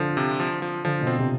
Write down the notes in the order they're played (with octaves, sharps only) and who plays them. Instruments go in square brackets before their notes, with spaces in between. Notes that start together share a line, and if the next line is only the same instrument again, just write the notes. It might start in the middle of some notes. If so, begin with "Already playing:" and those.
Already playing: [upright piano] D3 [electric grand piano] F3
[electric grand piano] C3
F3
F3
[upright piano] D3 [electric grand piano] F3
[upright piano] B2
[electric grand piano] C4
[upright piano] C3